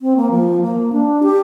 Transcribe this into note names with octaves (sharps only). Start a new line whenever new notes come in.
C4
A#3
F3
A#3
D4
G4